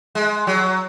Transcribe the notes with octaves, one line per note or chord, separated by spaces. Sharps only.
G#3
F#3